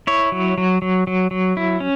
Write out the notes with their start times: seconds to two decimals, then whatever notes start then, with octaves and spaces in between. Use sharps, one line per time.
0.07 E4 C#5
0.32 F#3
0.58 F#3
0.82 F#3
1.07 F#3
1.31 F#3
1.57 E4
1.80 C#4